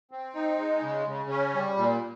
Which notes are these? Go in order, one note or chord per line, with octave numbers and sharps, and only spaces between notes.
C4
D#4
G#3
C#3
C#3
C#4
G3
A#2